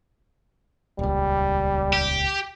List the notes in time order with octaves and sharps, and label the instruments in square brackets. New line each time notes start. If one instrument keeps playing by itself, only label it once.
[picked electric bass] D#1 C#2 [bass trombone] G3
[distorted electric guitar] G4